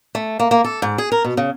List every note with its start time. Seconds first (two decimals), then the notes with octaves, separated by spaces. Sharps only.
0.15 A3
0.40 A#3
0.51 A#3
0.64 A4
0.82 G#2
0.98 G#4
1.12 A#4
1.24 B2
1.37 C#3